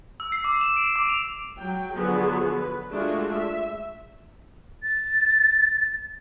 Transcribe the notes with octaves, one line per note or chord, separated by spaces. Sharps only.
E6
C7
D6
E7
D7
D6
F7
F#3 G5
D3 F3 F#3 B3 F#4 G#4
B4
G#3 A3 D4 F4 F#4
E5
A6